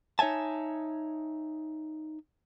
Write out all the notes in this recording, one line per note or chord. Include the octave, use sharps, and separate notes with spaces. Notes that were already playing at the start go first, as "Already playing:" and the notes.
D#4 C#5 E5 G#5 A5